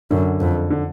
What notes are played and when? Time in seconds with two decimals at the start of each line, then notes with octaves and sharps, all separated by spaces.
0.11 F#2 D3
0.40 F2
0.70 D3